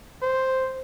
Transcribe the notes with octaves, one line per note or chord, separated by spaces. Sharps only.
C5